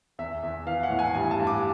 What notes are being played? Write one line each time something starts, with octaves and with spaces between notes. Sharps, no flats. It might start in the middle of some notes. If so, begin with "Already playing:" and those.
E2 E5
E2
E3 F5
F#5
A2
G#5
G2 G#5
A5
G2
D6